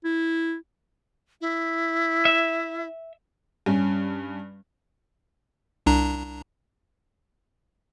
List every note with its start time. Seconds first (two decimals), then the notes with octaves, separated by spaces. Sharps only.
0.05 E4
1.41 E4
2.25 E5
3.66 G2 C#4
5.86 C2 D4 A#5